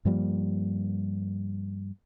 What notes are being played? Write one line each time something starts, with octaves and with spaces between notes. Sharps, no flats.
G2 F3 G3 A#3